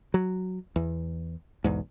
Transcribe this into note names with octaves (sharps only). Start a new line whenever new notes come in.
F#3
E2
B1 E2 G#2